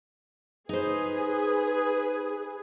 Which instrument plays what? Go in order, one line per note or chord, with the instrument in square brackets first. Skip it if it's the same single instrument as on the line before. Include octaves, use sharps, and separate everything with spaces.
[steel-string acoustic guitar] D#4 C5 [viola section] G#4 [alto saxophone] B4